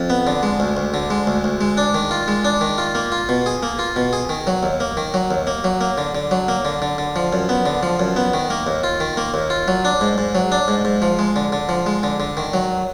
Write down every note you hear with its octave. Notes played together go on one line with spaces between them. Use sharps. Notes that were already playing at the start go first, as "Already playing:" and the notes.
Already playing: F2
B3
D3
G#3
D2
D2
D3
G#3
D2
D2
G#3
D4
D#3
F4
G#3
D4
D#3
F4
A#3
F4
B2
G#4
A#3
F4
B2
G#4
D#3
F#3
D#2
A#3
D#3
F#3
D#2
A#3
F#3
A#3
D3
D3
F#3
A#3
D3
D3
D3
F3
F#2
B3
D3
F3
F#2
B3
D#3
A#3
D#2
F4
D#3
A#3
D#2
F4
F#3
D4
G#2
G#2
F#3
D4
G#2
G#2
F3
G#3
D3
D3
F3
G#3
D3
D3
D#3
F#3